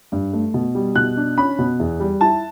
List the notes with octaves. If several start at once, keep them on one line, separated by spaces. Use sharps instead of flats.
G2
A3
B2
G3
B2 F#6
D4
C#4 B5
B2
E2
G3
E4 A5